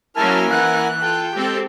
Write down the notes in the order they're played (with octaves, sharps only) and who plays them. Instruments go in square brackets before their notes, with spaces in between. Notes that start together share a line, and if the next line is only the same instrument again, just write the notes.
[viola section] F#3 A#3 C#4 [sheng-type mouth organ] E4 A#4 G#5 [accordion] A5 [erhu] F6
[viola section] E3 [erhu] F#5 [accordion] F#6
[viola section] F4 [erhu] A4 [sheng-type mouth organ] G5
[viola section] G#3 C4 A4 [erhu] G4